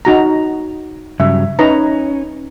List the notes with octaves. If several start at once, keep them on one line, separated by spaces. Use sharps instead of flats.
D#4 F#4 A#5
G2 C#3 F#3 E5
C#4 D#4 B4 A#5